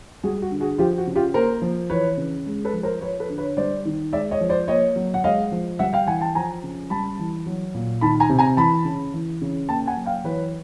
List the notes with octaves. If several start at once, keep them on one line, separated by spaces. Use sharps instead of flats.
G3 F#4 G#4
F#4
D3
F#4 G#4
F3 F4 G4
F#4
C#3
F4 G4
A#3 A#4 C5
F3
E3 B4 C#5
C#3
G#3
A4 B4
F3
A#4 C5
F3 B4 C#5
A4 B4
D3
B4 C#5
G3 C5 D5
D#3
G#3 D5 E5
C#5 D#5
F3
C5 D5
A#3 C#5 D#5
F#3
F#5
G#3 D#5 F5
F3
G3 E5 F#5
F5 G5
E3 F#5 G#5
G5 A5
F3 G#5 A#5
C#3
G3 A5 B5
E3
F#3
A#2
D#3 A5 B5
G#5 A#5
C3
G#5 A#5
E3 A5 B5
C#3
E3
C#3
A#3 G5 A5
F#5 G#5
F#3
F5 G5
E3 B4 C#5